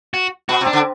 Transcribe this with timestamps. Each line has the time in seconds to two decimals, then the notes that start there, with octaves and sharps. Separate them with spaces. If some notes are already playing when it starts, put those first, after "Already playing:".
0.14 F#4
0.49 B2 F#4
0.61 C3
0.67 D4
0.73 D3